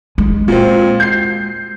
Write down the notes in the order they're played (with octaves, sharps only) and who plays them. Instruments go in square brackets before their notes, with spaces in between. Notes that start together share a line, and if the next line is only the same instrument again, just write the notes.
[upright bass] G#3
[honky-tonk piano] A#2 C4
G6 C7